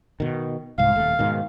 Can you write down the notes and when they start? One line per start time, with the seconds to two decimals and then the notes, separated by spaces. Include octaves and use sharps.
0.20 B2 D#3
0.78 C2 G#2 F5
0.96 D#1 A3
1.19 G#2 B2 D#3